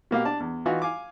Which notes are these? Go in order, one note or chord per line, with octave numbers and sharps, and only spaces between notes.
B2 A#3 G4 F5
D4 D5 A5
E2
E3 D#4 F4 F#4
F5 G#5 D6